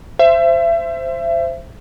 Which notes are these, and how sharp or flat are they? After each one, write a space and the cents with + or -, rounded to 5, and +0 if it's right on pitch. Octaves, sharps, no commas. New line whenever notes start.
C5 +0 E5 +30